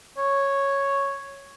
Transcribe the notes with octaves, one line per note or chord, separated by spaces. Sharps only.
C#5